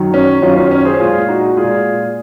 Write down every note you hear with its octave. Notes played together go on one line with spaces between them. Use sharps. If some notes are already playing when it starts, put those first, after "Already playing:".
Already playing: F#2 D#3 F#3
C#4
F#2 D#3 F#3 C#4 F4
C#4 F4
C#4
G#4 C5
A#2 G#3 F4 G#4
D#4 F#4
A#2 G#3 F4 G#4